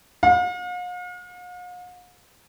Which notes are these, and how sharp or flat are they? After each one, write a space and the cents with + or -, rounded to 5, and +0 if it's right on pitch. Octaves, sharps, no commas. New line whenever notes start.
F5 +45